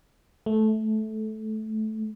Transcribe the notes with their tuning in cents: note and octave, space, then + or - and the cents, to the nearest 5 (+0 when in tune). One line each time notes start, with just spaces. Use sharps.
A3 -15